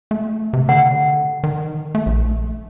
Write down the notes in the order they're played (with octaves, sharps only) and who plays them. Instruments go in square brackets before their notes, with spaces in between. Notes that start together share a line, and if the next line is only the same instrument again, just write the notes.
[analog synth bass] A3
C3
[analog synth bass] D3 [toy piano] F#5
[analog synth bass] D#3
A3
A#1